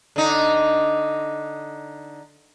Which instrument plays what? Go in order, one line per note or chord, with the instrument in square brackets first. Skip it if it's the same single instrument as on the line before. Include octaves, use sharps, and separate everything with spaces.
[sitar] D3 D#4